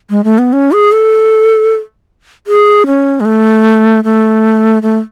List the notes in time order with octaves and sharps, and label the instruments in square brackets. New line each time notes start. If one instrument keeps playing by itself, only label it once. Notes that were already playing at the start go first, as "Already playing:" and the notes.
[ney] G#3
A3
B3
C#4
G#4
A4
G#4
C#4
G#3
A3
A3
A3